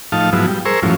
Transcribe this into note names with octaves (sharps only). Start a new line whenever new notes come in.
A2 F3 D#4 F5 A5
G#2 F3 F#3 B3 E4
G3
G#4 A#4 C5 C#6 E6
F#2 A2 E3 F3 C#4